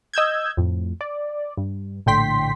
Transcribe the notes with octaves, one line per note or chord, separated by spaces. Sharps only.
D#5 E6 G6 G#6
F2 A2
D5
G2
A#1 A2 D3 G5 C6 B6